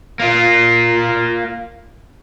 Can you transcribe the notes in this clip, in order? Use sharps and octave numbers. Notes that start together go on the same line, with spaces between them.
A#3 F4